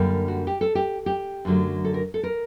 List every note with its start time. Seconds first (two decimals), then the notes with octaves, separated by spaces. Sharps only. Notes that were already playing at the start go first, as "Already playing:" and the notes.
Already playing: F#2 D3 G3 A#3 D4
0.28 F#4
0.47 G4
0.61 A4
0.75 G4
1.06 G4
1.45 F#2 D3 F#3 A3
1.85 A4
1.94 A#4
2.14 A4
2.23 A#4